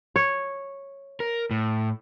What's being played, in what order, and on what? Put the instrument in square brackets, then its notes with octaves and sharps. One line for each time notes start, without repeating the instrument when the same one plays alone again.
[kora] C#5
[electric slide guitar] A#4
A2